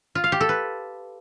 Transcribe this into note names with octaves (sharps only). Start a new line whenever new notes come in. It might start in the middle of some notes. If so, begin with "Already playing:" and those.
F4
F5
G4
A4
B4